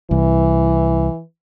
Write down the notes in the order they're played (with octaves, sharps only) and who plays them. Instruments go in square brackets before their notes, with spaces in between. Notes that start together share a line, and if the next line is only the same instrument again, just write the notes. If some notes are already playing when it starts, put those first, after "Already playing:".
[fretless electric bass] C2 [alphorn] E3